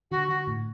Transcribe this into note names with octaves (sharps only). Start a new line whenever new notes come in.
D3 F#4
D3 F#4
A2